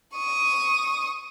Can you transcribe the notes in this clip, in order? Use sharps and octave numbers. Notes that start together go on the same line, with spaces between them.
C#6 D#6